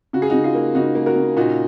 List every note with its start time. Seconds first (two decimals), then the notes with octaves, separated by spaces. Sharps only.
0.13 C#3 F#4
0.22 G#4
0.30 C#3 D#4 F#4
0.44 F4 G#4
0.55 A#3
0.75 C#3 D#4 F#4
0.95 A#3
1.06 F#4 A#4
1.16 C#3
1.37 A#2 D#4 F#4